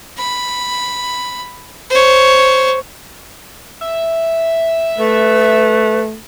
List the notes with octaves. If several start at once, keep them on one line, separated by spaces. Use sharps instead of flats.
B5
C5 C#5
E5
A3 B4